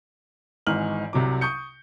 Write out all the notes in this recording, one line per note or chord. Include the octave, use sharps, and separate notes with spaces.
G#1 G#2 E3 F6 F#7
C2 C3 F#3 D6
C#6 D#6 G6 C#7